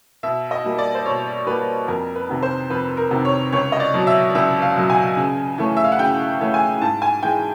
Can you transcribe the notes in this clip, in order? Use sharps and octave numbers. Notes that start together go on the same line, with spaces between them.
B2 E5
D#5
G3 A#3
D5
C5
B2 C#5
G3 A#3 B4
F2 A#4
B4
C3 D#3
C5
F2 B4
A#4
C3 D#3
C#5
C#2 C#5
D#5
D5
B2 F#3
E5
C#2 E5
F5
B2 F#3
G#5
C#3
E3 A3 C#4
E5
F5
F#5
C#3 G5
E3 A3 C#4
G#5
G#2 A5
G#5
E3 G#3 G5